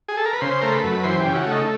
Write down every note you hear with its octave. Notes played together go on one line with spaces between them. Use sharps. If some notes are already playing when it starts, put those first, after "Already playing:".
G#4
A4
A#4
B4
C#3 C5
A3 A#4
B4
F#2
E3 C5
G4
C#3
F#4
A3
D#4